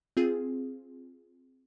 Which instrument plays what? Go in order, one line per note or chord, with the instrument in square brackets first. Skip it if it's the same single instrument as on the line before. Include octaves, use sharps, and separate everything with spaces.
[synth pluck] C4 F4 G#4